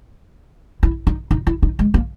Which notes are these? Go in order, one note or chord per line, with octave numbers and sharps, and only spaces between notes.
E4
D#4
D#4
E4
D#4
G#3
A#3